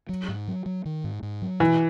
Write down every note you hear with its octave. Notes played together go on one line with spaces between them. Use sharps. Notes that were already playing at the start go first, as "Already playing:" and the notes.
F#3
G#2
F#3
F#3
D#3
G#2
G#2
F#3
B2 E3